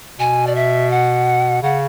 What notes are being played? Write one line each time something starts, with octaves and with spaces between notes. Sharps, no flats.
B2 G#5
D5
E5
F#5
C#3 F#5